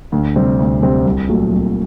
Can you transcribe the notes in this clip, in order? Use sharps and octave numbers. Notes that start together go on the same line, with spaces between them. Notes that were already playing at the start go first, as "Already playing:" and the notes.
D2
C3 G3 C4 G4
D2
C3 G3 C4 G4
C2
A#2 F#3 A3
C2